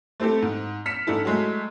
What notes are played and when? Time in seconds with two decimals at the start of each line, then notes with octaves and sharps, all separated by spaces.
0.20 A3 C4 E4 G4 A4
0.42 G#2
0.86 F6 B6 C#7 E7
1.07 G#2 D4 E4 A4
1.25 F#3 G#3 A3